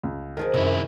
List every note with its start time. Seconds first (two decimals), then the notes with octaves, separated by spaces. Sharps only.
0.03 C#2
0.37 D#3 F3 F#3 G#4 A#4
0.54 F#2 C3 D#3 E4 F#4 E5